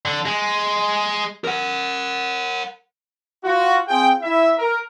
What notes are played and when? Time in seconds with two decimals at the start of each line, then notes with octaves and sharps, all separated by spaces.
0.05 D3
0.25 G#3
1.44 A#4 F#5
3.44 F4 F#4
3.88 C4 F4 G#4 G5
4.22 E4 E5
4.58 A#4